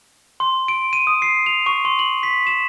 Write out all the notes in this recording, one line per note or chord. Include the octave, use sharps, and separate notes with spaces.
C6
D7
D#7
D#6
C7
F7
C#6
C6
F#7
B6
E7